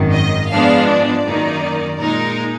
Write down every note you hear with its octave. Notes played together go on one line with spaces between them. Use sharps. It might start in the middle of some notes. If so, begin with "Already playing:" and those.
Already playing: G#1 F#2 D#3
D#5
G#2 F3 G#3 B3 D4 F5
D5
F#2 D#3 A#3 D#4
A#2 G#3 D#4 A#4